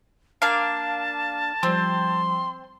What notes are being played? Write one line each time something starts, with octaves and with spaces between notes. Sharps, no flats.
A#3 D4 F5 A5
F3 G3 C4 C6